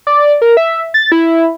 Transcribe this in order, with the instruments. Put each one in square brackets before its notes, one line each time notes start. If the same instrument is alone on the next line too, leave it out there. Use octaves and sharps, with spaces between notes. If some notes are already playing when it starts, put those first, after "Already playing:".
[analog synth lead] D5
A#4
E5
A6
E4